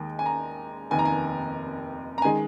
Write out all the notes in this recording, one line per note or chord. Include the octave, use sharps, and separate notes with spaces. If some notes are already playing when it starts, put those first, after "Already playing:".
Already playing: D#2 D#3 G#3
G#5
A#5
F1 D#2 D#3 G#5
A#5
G#5
A#5
D#3 G#3 G#5